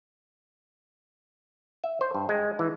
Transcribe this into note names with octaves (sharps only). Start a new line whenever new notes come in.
E5
C5
G2
G#3
E3